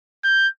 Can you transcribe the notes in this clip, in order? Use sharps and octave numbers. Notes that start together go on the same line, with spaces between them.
G6